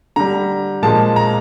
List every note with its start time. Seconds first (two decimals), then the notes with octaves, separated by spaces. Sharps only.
0.16 D3 G3 A#5
0.83 A#2 F3 G#3 A5
1.16 A#5